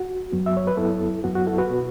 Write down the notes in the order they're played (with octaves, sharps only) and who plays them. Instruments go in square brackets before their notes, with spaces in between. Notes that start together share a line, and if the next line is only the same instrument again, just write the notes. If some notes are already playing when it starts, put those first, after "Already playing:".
Already playing: [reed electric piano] F#4
F#2 F#3 B3
E5
C#5
B4
F#2 F#3 B3 E4 A4
F#2 F#3 B3 F#4
F#4
E4 A4
F#4 B4
B2 B3